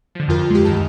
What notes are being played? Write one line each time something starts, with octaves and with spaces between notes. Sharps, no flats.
D3 F3
F2 F3 F4 A#4
G#3 G4
C#2 F#2 D#3 D#4 A5